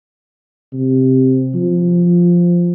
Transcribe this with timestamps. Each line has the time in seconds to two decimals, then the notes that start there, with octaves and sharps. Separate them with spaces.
0.73 C3
1.55 F3